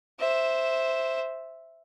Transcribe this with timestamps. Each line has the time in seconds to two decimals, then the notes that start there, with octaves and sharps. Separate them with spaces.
0.20 C5 E5